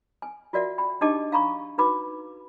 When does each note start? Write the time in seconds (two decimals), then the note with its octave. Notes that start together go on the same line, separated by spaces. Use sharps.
0.22 G#5
0.53 F4 F#4 A#4 D5 E5 F#5
0.78 G5 B5
1.01 D4 D#4 G4 D#5 A5 D6
1.32 F5 A#5 B5 C#6
1.78 D#4 F#4 B4 B5 D6